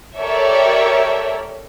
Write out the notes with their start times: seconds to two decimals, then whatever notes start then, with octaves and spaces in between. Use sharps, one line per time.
0.17 G4 A4 A#4 C#5 D5 E5